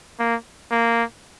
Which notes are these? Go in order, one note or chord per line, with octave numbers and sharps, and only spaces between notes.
A#3
A#3